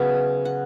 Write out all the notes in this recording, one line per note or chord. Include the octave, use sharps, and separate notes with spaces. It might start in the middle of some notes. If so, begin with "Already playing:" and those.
Already playing: C#3 F#3 B3 E5
F#5